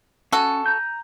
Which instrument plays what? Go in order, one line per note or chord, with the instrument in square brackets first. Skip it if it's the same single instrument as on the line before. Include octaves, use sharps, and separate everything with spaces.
[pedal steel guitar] C#4 [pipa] F#4 A4
[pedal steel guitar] A#5 G6